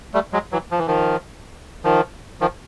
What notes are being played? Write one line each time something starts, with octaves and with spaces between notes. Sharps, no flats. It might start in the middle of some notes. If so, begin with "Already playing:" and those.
G3 A3
F#3 G#3
E3 F#3
F3
E3
D#3 F3
D#3 F3
D#3 F3